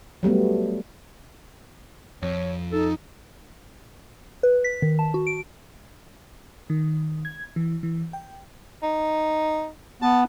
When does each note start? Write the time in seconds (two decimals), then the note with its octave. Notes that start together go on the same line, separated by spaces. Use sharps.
0.23 F#3 G3 A3 B3
2.23 F2 C#5
2.72 D#4 A4
4.43 B4
4.64 B6
4.82 D#3
4.99 A5
5.14 F#4
5.27 D7
6.70 D#3
7.25 G#6
7.56 E3
7.83 E3
8.13 G5
8.83 D#4
10.02 B3 A5